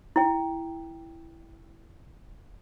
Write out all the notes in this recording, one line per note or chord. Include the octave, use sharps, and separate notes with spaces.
E4 G5